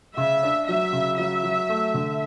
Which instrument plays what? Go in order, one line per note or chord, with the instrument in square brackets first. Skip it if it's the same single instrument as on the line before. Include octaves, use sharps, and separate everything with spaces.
[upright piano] C#3 [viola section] E5
[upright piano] D4
[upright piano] F#3 [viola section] E5
[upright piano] C#3
[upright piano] F#3 [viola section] E5
[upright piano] F#3
A3
D3